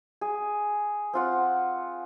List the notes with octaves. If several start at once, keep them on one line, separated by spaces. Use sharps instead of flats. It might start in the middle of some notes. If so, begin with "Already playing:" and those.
G#4
C4 F4 F#5